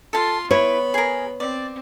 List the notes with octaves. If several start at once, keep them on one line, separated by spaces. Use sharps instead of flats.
F4 A4 A5 C6
B3 E4 B4 C#5 B5
G#4 A#4
C4 D5